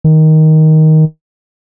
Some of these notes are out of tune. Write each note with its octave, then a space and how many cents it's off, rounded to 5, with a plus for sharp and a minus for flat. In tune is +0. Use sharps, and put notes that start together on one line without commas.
D#3 +10